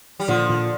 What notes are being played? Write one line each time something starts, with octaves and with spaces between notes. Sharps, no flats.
G3
A#2 D3 F3
A#2